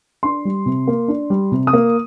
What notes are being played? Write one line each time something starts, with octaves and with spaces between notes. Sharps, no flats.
D4 C6
G3
C3
A#3
D4
G3
C3
D#6
A#3